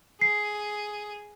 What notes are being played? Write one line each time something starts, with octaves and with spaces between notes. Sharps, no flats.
G#4 C7